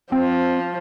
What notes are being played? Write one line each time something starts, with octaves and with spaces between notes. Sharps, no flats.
F3 C4